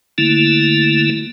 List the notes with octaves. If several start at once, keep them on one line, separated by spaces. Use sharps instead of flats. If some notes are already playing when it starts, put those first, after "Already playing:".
D3 A3 A#3 E4